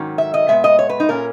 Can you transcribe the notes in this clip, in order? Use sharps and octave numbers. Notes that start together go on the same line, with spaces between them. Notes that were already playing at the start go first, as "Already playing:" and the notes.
Already playing: G#2 D#3 F#3 C#4
E5
D#5
A#2 G#3 B3 E5
D#5
C#5
B4
D#4
A#2 A#3 C#4 A#4